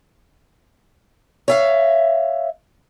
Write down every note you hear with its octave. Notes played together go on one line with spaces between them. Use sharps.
C#5 E5 F5